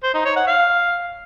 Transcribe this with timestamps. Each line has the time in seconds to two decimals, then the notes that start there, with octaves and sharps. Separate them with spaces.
0.03 C5
0.14 D#4
0.25 C#5
0.36 F#5
0.47 F5